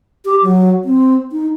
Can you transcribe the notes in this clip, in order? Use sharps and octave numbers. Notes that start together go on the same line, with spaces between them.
G4
F#3
C4
D#4